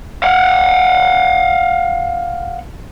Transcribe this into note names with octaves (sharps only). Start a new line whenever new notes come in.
F5 F#5